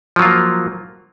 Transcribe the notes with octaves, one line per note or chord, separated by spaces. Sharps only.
F3 F#3 A#3 F4